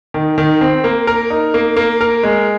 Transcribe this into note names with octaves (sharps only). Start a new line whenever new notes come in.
D#3
D#3
C4
A#3
A#4
D#4
A#3
A#3
A#4
G#3